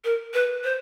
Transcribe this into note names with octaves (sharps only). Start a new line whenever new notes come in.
A#4
B4
C5